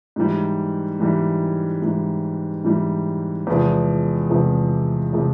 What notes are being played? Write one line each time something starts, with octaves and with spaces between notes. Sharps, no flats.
G#2 E3 G3
G#2 E3 G3
G#2 E3 G3
G#2 E3 G3
E2 C3 F3 G#3
E2 C3 F3 G#3
C3 F3 G#3